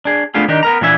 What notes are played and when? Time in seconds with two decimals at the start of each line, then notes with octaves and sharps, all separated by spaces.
0.05 D4 G#4
0.34 A3 B3 D4 F4 G#4
0.49 D#3 D4 D#4 G4
0.63 B3 A#4 A#5
0.81 A#2 E3 D4 E5 G#5